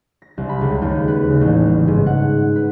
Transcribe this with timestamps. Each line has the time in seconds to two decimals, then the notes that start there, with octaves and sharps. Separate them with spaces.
0.22 A#6
0.38 C2
0.49 B5
0.61 C#2
0.82 D#2
1.08 B4
1.29 C#3
1.41 A1
1.67 G3
1.88 G#2
2.06 F#5
2.56 B4